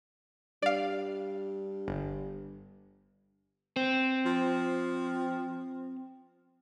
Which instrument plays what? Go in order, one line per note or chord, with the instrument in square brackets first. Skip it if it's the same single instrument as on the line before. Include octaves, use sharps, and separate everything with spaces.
[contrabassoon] G2 [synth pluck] D5 F5
[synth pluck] G1
[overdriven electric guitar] C4
[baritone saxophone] F3